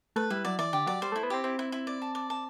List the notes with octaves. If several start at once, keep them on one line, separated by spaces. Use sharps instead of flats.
A3 B4
G3 E4
F#3 D5
E3 D5
D3 G4
F#3 D5
G3 C5
A3 E4
B3
C4 G4
C4 E4
E4
E4
D5
A5
D5
A5